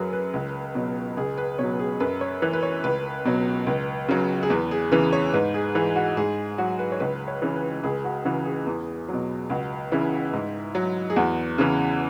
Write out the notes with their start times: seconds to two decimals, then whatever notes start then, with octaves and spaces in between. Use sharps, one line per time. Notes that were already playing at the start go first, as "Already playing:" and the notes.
Already playing: F#2 F#3 G#4 B4
0.13 B4
0.34 C#2
0.75 B2 F#3
1.17 C#2 G#4
1.38 B4
1.59 B2 F#3 C#5
1.79 G#4
2.00 F#2 B4
2.21 C#5
2.42 E3 B4
2.53 B4
2.63 C#5
2.84 C#2 B4
3.25 B2 F#3
3.67 C#2
4.09 C#3 F#3
4.43 G#4
4.50 E2 B4
4.71 G#4
4.92 C#3 E3 B4
5.12 C#5
5.33 G#2 B4
5.54 G#4
5.75 E3 G#4
5.96 F#4
6.17 G#2 G#4
6.58 F#3 F#4
6.79 B4
6.92 C#5
7.00 C#2 B4
7.28 C#5
7.42 C#3 E3
7.56 B4
7.83 C#2 G#4
8.05 F#4
8.25 C#3 E3 F#4
8.45 G#4
8.66 E2
9.08 B2 F#3
9.50 C#2 F#4
9.92 C#3 E3 E4
10.33 G#2
10.75 F#3
11.10 G#4
11.16 E2 F#4
11.58 C#3 E3